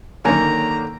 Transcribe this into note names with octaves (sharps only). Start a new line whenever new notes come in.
F#2 D3 D#3 F#3 A#3 C#5 G#5 A#5